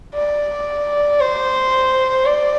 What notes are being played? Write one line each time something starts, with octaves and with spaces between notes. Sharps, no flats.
D5
C5
D5